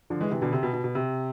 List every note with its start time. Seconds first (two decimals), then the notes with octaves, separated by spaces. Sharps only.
0.10 D3 F3
0.21 E3 G#3
0.31 C3 E3
0.42 B2 D3
0.53 C3
0.63 B2
0.73 B2
0.84 B2
0.95 C3